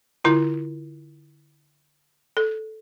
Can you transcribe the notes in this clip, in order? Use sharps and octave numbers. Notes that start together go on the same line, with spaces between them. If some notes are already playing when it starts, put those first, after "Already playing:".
D3 E4 F4
A4